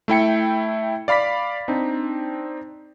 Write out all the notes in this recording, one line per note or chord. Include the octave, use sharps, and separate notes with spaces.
A3 E4 G5 C#7
D5 F5 B5 D6 B6
C4 D4 D#4